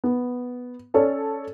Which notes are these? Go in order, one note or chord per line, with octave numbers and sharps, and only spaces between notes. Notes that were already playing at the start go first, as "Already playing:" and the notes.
B3
C#4 A4 C#5 D5